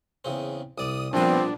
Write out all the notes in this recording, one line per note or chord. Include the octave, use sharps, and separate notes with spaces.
E2 C#3 C4
C2 D5 D#6 D#7
A#1 A#2 F3 G3 B3 C4 D4 D#6